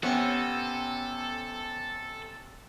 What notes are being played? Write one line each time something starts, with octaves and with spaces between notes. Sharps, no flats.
C3 B3 C#4 A4